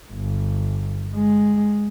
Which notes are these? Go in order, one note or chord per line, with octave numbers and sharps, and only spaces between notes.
G1
G#3